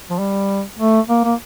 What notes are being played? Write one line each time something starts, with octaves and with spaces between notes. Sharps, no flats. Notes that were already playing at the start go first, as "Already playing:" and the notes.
F3
G3
A3
A#3
A#3